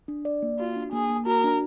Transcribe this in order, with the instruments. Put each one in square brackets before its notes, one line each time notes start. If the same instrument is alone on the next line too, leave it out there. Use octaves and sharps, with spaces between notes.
[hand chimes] D4
D5
A#3
[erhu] F4 [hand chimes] F#4
[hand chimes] D4
[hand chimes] A#3 [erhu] G#4
[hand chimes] A#3
[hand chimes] F#4 [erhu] A#4
[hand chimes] D4